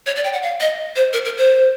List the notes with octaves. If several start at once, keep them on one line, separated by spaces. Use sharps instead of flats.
C#5
D5
G5
F#5
F5
D#5
C5
A#4
A#4
C5